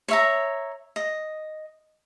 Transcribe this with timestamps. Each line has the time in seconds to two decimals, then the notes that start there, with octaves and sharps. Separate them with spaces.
0.08 C#5 E5 A#5
0.96 D#5